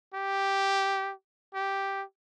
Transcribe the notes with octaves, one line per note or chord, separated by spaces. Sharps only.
G4
G4